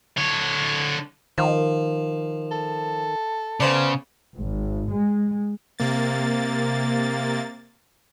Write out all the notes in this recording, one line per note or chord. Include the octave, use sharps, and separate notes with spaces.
D3 C#5
D#3 F3
A4
C#3 B3 C5 D5
G#1
G#3
C3 A#3 A6